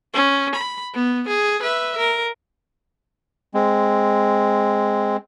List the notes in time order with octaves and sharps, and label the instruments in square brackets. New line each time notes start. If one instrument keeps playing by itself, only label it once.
[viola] C#4
B5
B3
G#4
B4 E5
A#4
[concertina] G#3 C4